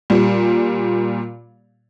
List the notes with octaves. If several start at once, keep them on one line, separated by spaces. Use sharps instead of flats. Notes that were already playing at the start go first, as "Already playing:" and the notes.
A#2 G3